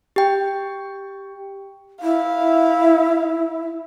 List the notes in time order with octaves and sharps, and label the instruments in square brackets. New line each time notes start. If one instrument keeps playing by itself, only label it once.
[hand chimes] G4 G5
[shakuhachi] E4 [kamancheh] F5